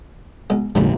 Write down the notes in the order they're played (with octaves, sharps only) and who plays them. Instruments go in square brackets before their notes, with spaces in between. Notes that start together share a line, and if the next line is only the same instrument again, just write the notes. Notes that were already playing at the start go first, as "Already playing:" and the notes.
[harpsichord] B1 G#3
[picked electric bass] F1 A#1 D3 [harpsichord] A#2 G3 G#3